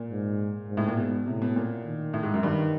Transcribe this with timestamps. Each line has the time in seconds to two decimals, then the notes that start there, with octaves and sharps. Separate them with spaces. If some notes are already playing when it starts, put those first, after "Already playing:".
Already playing: A#2
0.11 G#2
0.68 G#2
0.77 A2
0.88 A#2
0.97 G#2 B2
1.26 A2 C3
1.42 B2
1.56 A#2
1.84 D#3
2.14 A2
2.23 G#2
2.34 F#2
2.43 G2 D#3